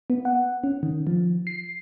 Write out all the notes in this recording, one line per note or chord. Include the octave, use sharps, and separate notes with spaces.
B3
F#5
C#4
D#3
F3
C7